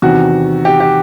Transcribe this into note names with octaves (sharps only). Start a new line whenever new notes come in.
E2 C3 D#3 F#4
G4
G4